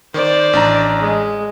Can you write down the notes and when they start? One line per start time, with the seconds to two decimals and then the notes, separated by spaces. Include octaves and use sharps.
0.14 D#3 C5 D5
0.53 A1 D4 A#5
0.99 G#3